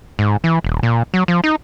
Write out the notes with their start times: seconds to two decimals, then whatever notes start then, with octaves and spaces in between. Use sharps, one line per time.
0.19 G#2
0.44 E3
0.64 D#1
0.83 A#2
1.14 F#3
1.28 F3
1.44 D#4